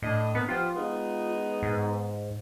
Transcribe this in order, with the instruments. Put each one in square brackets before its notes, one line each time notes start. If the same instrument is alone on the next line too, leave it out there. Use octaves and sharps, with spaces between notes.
[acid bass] A2 [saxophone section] D4 D#5
[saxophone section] A#3 A#4 B4 [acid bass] B3
[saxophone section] F3 G4 F#5 [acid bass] F4
[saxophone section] G#3 B3 D#4
[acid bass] G#2